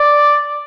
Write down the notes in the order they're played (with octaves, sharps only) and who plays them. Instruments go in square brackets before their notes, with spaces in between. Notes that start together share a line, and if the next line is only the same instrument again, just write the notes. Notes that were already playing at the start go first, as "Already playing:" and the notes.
Already playing: [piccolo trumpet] D5